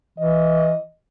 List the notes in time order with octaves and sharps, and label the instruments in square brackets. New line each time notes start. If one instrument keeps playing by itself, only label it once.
[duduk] E3 [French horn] D#5